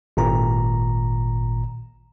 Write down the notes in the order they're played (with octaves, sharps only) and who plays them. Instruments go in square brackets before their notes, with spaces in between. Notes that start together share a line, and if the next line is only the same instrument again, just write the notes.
[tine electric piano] G#1 A#2 A#5